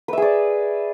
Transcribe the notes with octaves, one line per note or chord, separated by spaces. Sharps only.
G#4 B4 D5 E5